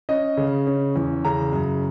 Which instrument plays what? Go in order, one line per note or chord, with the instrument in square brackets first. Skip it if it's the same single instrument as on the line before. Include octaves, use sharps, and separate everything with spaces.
[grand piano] C#4 D#5
C#3
C#4
E2
C#3 A#5
F#2